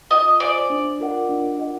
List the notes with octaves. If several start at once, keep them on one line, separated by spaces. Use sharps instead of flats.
F4 D#5
G#4 C5 D5 E5 G#5
D4
F4 A#4 D#5 F#5
D4
F4 A#4 D#5 F#5